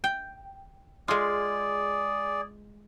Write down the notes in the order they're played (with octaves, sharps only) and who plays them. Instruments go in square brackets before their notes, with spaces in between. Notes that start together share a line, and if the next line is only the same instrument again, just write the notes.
[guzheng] G5
[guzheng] G#3 F4 [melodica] G#4 D5